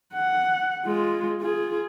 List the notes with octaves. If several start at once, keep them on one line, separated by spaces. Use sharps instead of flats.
F#5
G#3 F4
F4 G#4